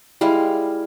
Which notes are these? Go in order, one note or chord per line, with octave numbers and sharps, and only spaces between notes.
G3 G#3 E4 F5